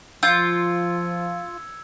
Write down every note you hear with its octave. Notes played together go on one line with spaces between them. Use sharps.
F3 F4 E6 G6 G#6 C#7